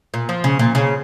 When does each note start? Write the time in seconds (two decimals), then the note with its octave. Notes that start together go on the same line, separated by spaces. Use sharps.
0.14 A#2
0.29 F3
0.44 C#3
0.59 A#2
0.75 C#3